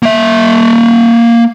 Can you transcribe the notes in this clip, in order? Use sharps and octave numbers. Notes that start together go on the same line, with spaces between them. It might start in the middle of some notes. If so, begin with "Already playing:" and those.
A#3 E5